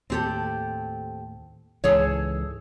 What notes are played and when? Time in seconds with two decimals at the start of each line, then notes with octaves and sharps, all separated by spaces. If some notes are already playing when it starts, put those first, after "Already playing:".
0.10 D#2 A2 C4 G4 A4
1.84 C#2 G#2 E3 G#4 A4 C#5